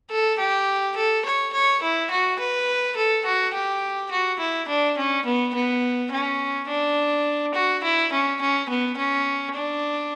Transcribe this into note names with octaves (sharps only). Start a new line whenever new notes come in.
A4
G4
A4
C#5
C#5
E4
F#4
B4
A4
F#4
G4
F#4
E4
D4
C#4
B3
B3
C#4
D4
F#4
E4
C#4
C#4
B3
C#4
D4